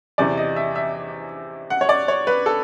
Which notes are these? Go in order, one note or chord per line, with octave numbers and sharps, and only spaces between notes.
E2 C3 E3 D5
D#5
E5
E5
F#5
C#5
D5
C#5
B4
A4